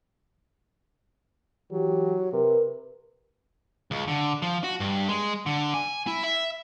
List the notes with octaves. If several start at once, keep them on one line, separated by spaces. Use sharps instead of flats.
E3 F#3 G4
C3 A#4 B4
C#2
D3
F3
F#4
G2
G#3
D3
G#5
E4
E5